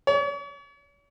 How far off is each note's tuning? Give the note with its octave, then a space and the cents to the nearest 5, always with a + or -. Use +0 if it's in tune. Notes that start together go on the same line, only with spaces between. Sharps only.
C#5 +45